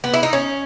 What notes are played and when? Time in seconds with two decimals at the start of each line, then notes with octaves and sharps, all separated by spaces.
0.04 B3
0.14 E4
0.23 D#4
0.33 C#4